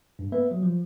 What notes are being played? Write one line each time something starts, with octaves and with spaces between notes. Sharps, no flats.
G2
A#3 B3 B4 E5
F#3
F3